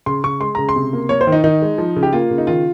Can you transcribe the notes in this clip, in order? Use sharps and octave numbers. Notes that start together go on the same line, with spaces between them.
C#3 C6
C#3 C#6
G#3 C6
C#3 A#5
C6
C3
A#3
A#3 C#5
C5
D#3
D#4
D#3 D#4
G#3
F3
C#3
G4
A#3 F4
C#3
D#4
D#3 F4